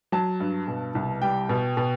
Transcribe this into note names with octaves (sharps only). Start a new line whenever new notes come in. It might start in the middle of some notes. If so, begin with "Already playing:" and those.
F#3 A5
G2
B2
C2
G3 G5
B2
B2